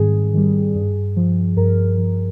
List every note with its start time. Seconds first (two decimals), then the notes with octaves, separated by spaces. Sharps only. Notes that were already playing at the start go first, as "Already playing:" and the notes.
Already playing: G#2 D#3 G3 C4 G#4
0.34 D#3 G3
0.75 G2
1.17 F3
1.57 G2 A#4
1.98 F3